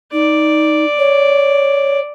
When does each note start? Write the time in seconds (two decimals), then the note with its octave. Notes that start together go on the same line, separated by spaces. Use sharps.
0.13 D#4 D5
0.99 C#5